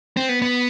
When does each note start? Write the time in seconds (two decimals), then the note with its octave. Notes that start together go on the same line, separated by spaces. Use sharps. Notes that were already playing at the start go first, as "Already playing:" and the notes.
0.17 C4
0.29 B3
0.42 B3